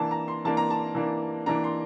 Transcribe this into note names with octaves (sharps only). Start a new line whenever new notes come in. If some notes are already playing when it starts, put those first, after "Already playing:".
Already playing: E3 A#3 D4 A5
A#5
C6
E3 A#3 D4 A5
A#5
A5
E3 A#3 D4
E3 A#3 D4 A#5
C6